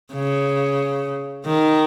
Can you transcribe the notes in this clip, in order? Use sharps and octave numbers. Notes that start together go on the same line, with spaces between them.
C#3
D#3